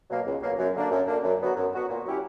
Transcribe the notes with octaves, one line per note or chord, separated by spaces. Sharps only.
B2 F#3 A#3
C#2
B2 F#3 A#3
F#2
D3 A#3 D4
F#2
D3 A#3 D4
F#2
D3 F#3 B3 F#4
F#2
D3 F#3 B3 F#4
A#2
F#3 C#4 E4 G4